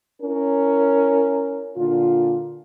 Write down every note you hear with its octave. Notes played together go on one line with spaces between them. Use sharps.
C#4 E4 A#4
A#2 D3 F4